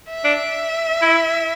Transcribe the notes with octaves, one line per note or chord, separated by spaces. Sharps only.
E5
D4
E4